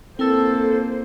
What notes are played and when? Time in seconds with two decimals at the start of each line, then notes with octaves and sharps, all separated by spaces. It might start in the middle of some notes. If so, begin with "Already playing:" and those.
0.19 A#3 C4 E4 A4 A#4 C5